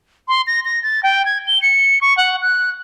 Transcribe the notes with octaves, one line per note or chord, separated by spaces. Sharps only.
C6
A#6
A#6
A6
G5
G#6
G7
C#7
C#6
F#5
F#6